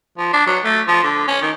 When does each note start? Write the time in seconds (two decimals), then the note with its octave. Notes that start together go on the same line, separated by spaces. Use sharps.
0.18 F3
0.33 D4
0.46 F#3
0.64 A3
0.88 F3
1.03 D3
1.28 C#4
1.42 D#3